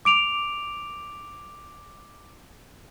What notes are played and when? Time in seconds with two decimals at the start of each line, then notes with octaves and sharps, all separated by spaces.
0.05 D6 D7 F7